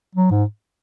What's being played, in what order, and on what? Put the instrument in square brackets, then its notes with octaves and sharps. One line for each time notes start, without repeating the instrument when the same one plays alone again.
[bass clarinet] F#3
G#2